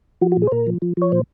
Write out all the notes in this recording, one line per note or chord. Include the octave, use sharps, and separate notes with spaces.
F3 F#4
F#4
A#2
G#4
C5
A#2 A#4
F3
F3
F3 C#5
A#2 C5